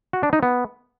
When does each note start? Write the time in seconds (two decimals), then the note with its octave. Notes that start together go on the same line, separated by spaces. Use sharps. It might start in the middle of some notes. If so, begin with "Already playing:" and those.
0.13 F#4
0.23 D4
0.33 D#4
0.43 B3